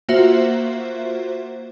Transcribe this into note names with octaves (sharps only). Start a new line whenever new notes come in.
A#3 F4 F#4 C5 E5